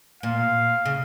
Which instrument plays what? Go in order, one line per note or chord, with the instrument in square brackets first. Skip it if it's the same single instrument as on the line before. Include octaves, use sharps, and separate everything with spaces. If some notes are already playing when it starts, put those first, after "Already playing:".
[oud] A#2 [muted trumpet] F5
[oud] C#3